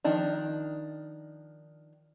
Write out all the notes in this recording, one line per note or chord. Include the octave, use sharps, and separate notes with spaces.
D#3 F3 D4 D#4